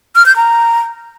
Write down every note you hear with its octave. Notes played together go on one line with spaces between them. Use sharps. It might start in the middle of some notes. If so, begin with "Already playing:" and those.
F6
G6
A#5